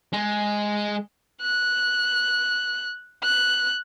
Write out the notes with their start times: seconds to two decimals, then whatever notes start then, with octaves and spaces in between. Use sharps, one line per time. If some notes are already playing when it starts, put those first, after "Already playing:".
0.13 G#3
1.41 F#6
3.23 F#6